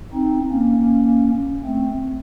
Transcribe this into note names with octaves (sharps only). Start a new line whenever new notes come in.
C4 D#4
A#3 C#4
A3 C4